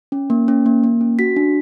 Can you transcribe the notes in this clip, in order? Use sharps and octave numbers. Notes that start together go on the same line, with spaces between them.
C#4
A#3
C#4
A#3
A#3
C#4
F#4 B6
D4